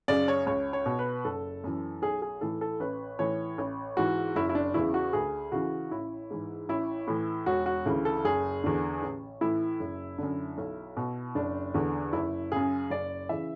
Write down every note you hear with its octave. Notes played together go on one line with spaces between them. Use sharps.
F#2 C#3 D5
C#5
C#2 C#5
C#5
B2
B4
F#1 A4
F#2 E3
B1 G#4
G#4
A2 E3 A4
A4
A1 B4
A2 E3 C#5
A1
G#2 E3 F#4
F#1 E4
E4
D4
E2 C#3 E4
F#4
D2 G#4
C#3 E3 F#4
A1 E4
G#2 E3
A1 E4
A2 E3
E1 F#4
F#4
D2 C#3 E3
A4
F#1 G#4
E2 D3
A1
A2 E3 E4
F#1
F#2 D3
B1
B2
F#1 D4
E2 D3
F#1 E4
F#2 C#3 G#4
F#1 D5
C#3 E3 E5